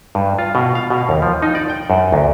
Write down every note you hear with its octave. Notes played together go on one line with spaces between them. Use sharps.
G2
F4
B2
F5
B2
D#2
F3
D#4
D5
G5
F#2
D2